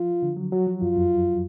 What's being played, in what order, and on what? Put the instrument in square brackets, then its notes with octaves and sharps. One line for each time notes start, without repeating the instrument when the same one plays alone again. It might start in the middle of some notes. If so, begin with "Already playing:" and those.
Already playing: [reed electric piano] F3 [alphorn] F4
[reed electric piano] D3
F#3
[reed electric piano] F#3 [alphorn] F#4
[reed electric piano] F3
[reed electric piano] F#2 [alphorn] F4
[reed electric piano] F2